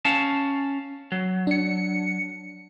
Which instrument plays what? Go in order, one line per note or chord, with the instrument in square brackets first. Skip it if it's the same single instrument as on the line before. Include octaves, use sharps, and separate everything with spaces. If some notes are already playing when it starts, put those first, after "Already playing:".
[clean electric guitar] C#4 F5 A5
F#3
[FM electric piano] D4 C#7